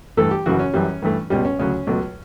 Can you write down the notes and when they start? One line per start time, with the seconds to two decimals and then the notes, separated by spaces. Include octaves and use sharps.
0.17 G2 E3 A3 A4
0.31 G4
0.46 F#2 C#3 E3 F#4
0.59 C#4
0.74 F#2 E3 G3
1.02 G2 E3 A3
1.30 C#2 B2 G3 C#4
1.45 C#4
1.59 D2 C#3 F#3 C#4
1.87 C#2 B2 F#3 A3